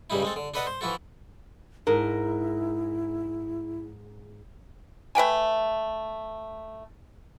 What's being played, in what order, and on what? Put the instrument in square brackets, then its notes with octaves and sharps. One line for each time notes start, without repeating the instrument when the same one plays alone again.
[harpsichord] G2 C#3 G3 D#4 E4
G#3 C4 A4
D3
D4 A4 B4 D#5 F#5 A5
C5
E3 F3 E4 F#4 A4
[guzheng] G#2 [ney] E4 [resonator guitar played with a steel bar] A#4
[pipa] A3 B4 G5 G#5